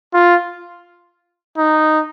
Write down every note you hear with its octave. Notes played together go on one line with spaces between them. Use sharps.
F4
D#4